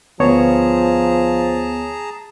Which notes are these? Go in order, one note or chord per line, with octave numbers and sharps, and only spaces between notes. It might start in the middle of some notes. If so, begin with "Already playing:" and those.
D2 F3 B3 G#4 C#5 A5 A#5